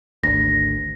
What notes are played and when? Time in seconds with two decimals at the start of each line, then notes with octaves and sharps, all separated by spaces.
0.23 G#1 D2 A#6